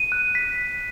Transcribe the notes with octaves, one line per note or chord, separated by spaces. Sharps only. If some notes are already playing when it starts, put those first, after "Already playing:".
Already playing: D#7
F#6
B6